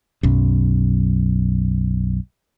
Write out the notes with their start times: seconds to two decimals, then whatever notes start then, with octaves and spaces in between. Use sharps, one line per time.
0.23 B1 F#2